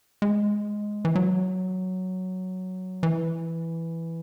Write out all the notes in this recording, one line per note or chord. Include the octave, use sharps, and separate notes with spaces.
G#3
E3
F#3
E3